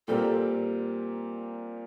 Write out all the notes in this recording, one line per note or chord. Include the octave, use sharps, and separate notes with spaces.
A#2 G3 C4 G4 A4 A#4